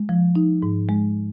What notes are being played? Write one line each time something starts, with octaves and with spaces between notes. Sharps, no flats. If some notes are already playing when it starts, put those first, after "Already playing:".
Already playing: G#3
F3
D#4
G#2
G#3